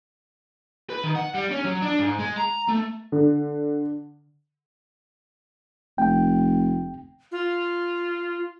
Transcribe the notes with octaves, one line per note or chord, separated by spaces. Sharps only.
B4
D#3
F#5
G3
C#4
F#3
D4
G#2
G#3
A#5
A3
D3
F1 G5
F4